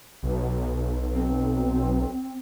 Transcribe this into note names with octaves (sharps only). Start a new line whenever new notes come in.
B1
C4